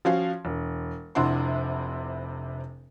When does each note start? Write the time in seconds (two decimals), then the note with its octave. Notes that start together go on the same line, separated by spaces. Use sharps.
0.05 F3 C#4 F#4 F5
0.45 E1
1.15 F1 C3 D4 E4 F#5 C6